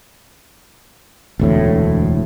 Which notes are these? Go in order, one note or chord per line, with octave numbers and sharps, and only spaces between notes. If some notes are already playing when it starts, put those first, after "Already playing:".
E1 D2 A2